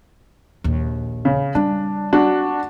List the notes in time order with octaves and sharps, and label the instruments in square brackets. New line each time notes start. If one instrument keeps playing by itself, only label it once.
[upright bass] A#1 D#2
[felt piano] C#3
[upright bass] G3 [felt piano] D4
[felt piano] D4 F#4